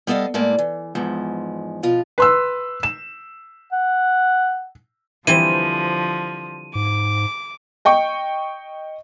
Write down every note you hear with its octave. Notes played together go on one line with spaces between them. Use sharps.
G3 B3 A4 D#5 F5
A2 G#3 A#3 D5
E3
E2 G#2 F3 G#3
B2 F3 F4
B4 C6 E6
E7
F#5
D3 E3 F3 G3 C4 D#7
G#2 D6
D#5 G5 C#6